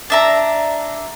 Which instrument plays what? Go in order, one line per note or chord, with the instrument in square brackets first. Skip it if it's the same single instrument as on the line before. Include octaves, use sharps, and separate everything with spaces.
[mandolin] D4 E5 A#5